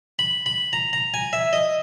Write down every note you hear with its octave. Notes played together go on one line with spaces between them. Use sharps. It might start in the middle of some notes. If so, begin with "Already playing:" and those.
B5
B5
A#5
A#5
G#5
E5
D#5